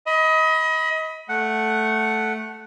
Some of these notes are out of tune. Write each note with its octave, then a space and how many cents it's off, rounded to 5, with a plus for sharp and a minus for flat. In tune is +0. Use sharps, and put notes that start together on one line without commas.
D#5 +30 B5 +0
A3 -5 F#5 +0